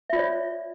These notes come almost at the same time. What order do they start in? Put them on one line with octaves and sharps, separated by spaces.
E5 F4 D5 C#5